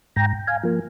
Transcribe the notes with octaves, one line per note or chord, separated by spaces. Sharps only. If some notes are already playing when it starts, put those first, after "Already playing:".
G#2 G5 A#5
F5 G#5
F3 A#3